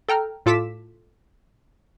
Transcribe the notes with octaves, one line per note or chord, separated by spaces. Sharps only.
A4 G5 A#5 F6
A2 F4 A4 D6 B6 E7